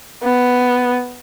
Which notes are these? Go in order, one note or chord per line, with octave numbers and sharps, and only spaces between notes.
B3